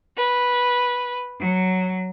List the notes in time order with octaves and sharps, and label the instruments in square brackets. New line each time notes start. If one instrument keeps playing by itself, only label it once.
[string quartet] B4
F#3